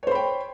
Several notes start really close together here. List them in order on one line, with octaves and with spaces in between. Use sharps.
C#5 C5 B5 G5